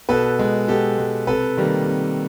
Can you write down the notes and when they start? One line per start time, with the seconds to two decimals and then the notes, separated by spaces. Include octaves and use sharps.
0.09 B2 A4 B4
0.39 G#3
0.68 B2 G4 A4
0.98 G#3
1.27 C3 A4 B4
1.57 D#3 G3 A#3
1.87 C3